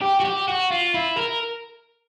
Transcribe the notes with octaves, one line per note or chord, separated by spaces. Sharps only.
G4
F#4
G4
F#4
F4
E4
A#4